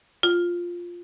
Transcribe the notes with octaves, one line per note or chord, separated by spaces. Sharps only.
F4